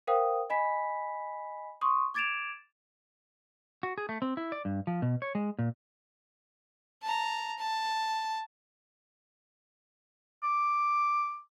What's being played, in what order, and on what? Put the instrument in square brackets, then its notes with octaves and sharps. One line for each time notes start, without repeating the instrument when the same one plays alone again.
[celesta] A#4 C5 F5 G5 D#6
D#5 G#5 B5 B6
C6 C#6 D#6
D6 G#6 A6 D7 E7 F7
[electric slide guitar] F#4
G#4
A3
C4
E4
D5
G2
F3
B2
C#5
G#3
A#2
[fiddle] A5 A#5
A5
[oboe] D6